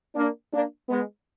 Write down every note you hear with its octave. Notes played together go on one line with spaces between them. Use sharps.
A#3 D4
A#3 D4
G#3 B3